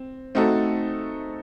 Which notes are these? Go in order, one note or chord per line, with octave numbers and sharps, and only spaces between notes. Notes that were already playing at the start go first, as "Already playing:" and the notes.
Already playing: C4
A3 C4 D#4 F#4 A4